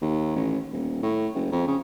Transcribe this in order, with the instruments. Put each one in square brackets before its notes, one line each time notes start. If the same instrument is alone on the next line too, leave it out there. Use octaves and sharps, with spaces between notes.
[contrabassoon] D#2
A1
D#1
A2
F#1
F2
C#3